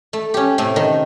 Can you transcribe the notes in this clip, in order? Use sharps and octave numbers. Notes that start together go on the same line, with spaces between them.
A3
C#4 G4
A2 C3 A3
D#3